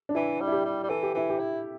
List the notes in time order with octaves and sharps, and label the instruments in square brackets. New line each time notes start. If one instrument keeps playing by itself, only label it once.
[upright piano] D4
[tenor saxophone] E3 [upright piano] E4
[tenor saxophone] G3
[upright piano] E4
G4
[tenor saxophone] G3
G3
[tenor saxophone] E3 [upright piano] A4
[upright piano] G4
[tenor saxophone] E3 [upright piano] E4
[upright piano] G4
[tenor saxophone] E4